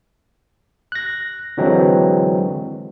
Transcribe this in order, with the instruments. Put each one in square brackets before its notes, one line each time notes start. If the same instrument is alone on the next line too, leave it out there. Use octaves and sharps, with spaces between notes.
[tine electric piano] F#6 A#6
D3 E3 F#3 G#3 C4